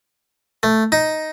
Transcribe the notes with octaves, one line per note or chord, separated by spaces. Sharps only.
A3
D#4